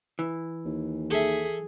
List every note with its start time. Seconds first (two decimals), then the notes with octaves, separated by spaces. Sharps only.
0.19 E3
0.65 D#2
1.10 G#4 A4 E5